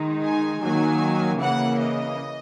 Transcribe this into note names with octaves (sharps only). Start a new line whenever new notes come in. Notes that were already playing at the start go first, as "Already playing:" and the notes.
Already playing: D#3 G#3 D#4
G#5
D#3 F#3 A#3 G#5
C#3 E3 A#3 F#5
D#5